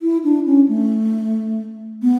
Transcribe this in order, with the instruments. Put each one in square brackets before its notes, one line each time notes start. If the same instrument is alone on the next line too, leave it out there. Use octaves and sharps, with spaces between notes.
[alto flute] E4
D4
C#4
A3
B3